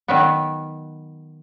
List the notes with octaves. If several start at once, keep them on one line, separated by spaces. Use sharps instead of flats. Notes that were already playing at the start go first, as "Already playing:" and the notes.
D#3 F#3 B3